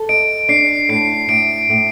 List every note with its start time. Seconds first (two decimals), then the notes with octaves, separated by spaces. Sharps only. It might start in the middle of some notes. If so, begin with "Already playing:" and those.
Already playing: A4
0.09 D#5 D7
0.49 D4 C7
0.89 A2 C7
1.29 A2 D7
1.70 A2